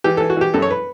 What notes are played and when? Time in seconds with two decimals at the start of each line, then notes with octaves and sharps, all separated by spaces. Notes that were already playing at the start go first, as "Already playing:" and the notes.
0.04 E3 G4
0.17 E3 A4
0.30 F#4
0.37 E3 G4
0.54 F#2 A4
0.62 C#5
0.71 B4